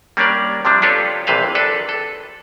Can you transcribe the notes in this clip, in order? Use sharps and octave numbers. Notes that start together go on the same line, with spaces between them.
G3 A#3 C#4 D4 A#4 D5
C3 F3 G3 D4
D4 F4 G4 A4 B4 C#5
A#1 C3 E3 B4 C5 F5
D4 A4 B4
A4